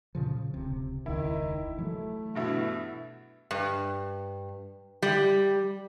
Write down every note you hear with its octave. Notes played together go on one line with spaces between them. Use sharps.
A#2 C#3 F3
D1 C#2 C3
E1 C#2 D#3 E4
E3 F#3 A3
G2 B2 E4
G2
G3